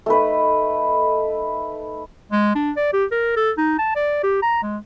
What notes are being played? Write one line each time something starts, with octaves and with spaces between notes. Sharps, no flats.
A3 D#4 B4
G#3
D4
D5
G4
A#4
A4
D#4
A5
D5
G4
A#5
G#3